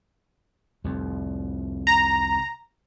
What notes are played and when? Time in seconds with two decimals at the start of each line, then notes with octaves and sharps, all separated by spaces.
0.84 C2 F2
1.87 A#5